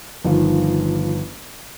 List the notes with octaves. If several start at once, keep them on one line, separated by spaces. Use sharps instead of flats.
G1 D#3 F3